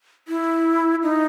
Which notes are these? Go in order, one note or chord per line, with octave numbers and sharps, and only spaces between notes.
E4
D#4